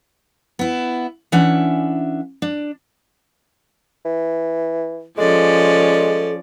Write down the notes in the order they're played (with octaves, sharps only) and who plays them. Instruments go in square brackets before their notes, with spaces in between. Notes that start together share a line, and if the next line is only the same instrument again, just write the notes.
[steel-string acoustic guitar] B3 E4
E3 C#4 D4 E5 F#5
D4
[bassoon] E3
[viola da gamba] F3 C#4 D5 [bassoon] G#3 [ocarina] A4